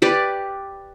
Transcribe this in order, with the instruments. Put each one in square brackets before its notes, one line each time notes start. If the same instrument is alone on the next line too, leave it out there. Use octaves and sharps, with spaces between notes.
[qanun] G4 B4 D5